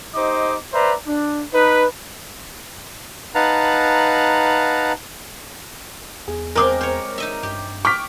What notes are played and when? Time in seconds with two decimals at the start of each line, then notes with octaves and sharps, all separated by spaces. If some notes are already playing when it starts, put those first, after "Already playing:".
0.15 D#4 G4 C5 D#5 D6
0.73 B4 C5 D5 E5 A#5
1.06 D4
1.53 D#4 B4
3.35 D#4 B4 F5 F#5 A5 A#5
6.28 E2 G#4
6.55 G#3 C4 A#4 C6 D6
6.81 C5 C#5
7.18 D#4 D#5 E5
7.43 G2 G4
7.85 G5 C#6 D6 F6 B6